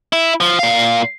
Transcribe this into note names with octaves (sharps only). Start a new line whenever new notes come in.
E4
F3
A#2 F5